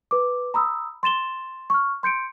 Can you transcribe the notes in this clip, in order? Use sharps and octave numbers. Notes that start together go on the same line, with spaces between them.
B4 D6
A#5 B5 D#6 E6
C6 A6 E7 G7
C#6 F6
C6 G6 C#7 D7